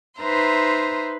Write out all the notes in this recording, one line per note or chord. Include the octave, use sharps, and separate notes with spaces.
D#4 B4 C5 E5 A#5 C6